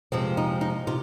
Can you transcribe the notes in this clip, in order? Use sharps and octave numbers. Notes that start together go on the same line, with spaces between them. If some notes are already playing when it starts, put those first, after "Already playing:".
F2 C3 F3 G#3 C4
D#4
D#4
C3 F4